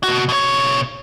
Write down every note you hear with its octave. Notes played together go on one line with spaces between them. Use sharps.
B2 F#4
B2 C#5